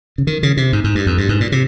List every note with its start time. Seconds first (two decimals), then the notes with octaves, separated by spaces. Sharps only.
0.18 C#3
0.27 D#3
0.43 C#3
0.57 C3
0.73 G#2
0.84 G#2
0.95 G2
1.06 F2
1.18 G2
1.29 G#2
1.40 A#2
1.52 C3